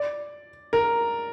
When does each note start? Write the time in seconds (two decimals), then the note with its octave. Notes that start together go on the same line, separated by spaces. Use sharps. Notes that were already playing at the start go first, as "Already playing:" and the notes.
Already playing: D5
0.73 A#4